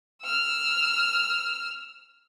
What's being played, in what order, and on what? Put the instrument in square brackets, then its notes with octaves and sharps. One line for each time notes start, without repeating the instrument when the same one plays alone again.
[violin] E6 F6